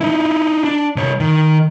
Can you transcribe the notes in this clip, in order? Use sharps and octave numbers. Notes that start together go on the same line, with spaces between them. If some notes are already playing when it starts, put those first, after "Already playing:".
D#4 E4
D4
C2 C#5
D#3